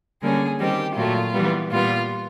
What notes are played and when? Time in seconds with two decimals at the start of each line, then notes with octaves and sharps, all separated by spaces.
0.21 D3 G3 A#3 C#4 G#4
0.59 D#3 G3 C4 G4
0.96 A#2 F#3 A3 F4
1.33 E3 G3 B3
1.71 A#2 G3 B3 F4